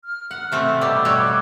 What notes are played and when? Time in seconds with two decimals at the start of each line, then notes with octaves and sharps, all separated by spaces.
0.05 F6
0.31 F#5
0.52 C3 A3 C4
0.81 B2 G3 D6 E6
1.05 G3 F#4 C#5